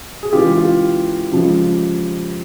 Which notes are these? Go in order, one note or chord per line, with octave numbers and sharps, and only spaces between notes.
G#4
C#3 E3 G#3 F4 G4
F4 G4
C#3 F3 G#3